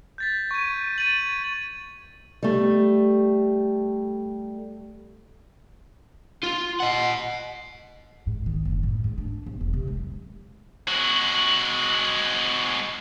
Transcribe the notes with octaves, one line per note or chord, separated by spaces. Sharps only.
G6 A6 B6
C#6 G#6 D#7
A6 D#7 F#7
G3 A3
F4
D#5 F#5
G#2
D#3
F#1
A2
G#2
D4
B1
E1
C3
G#3
G#3 F#4